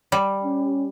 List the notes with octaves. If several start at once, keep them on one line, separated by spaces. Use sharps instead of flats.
G3
C#4